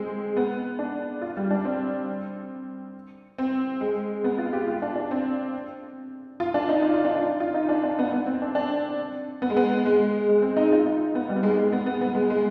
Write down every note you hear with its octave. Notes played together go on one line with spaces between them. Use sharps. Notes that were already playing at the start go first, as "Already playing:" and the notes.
Already playing: G#3 C4
B3
D4
F4
G3
D4
C4
C4
G#3
B3
F4
G4
F4
D4
D4
C4
F4
D4
D#4
F4
F4
D4
D4
F4
D#4
D4
D4
B3
B3
C4
D4
D4
B3
G#3
B3
G#3
G#3
C4
D#4
F4
D#4
B3
G3
B3
G#3
G#3
B3
B3
B3
G#3
G#3